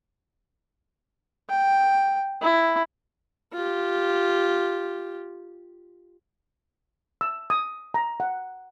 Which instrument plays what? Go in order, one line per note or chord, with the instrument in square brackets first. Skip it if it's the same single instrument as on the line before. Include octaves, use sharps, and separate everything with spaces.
[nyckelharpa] G5
E4
F4 G4
[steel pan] E6
D#6
A#5
F#5